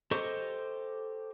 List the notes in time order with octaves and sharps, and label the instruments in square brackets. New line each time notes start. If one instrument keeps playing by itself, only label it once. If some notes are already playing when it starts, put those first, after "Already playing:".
[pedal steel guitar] G4 A4 C5 D#5 C#6